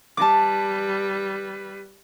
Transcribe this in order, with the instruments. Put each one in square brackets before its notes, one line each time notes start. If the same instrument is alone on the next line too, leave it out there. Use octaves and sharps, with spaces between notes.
[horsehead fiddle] G3 B4 [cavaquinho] A5 D6